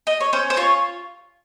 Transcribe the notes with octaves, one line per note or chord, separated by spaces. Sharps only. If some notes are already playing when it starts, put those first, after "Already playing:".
D#5
C#5
C#4 C5
C5
F4 C#5